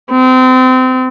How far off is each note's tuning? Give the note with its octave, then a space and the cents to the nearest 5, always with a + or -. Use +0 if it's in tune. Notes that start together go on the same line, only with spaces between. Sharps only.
C4 -30